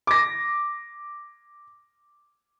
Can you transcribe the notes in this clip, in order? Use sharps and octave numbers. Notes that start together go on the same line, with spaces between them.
D6 A#6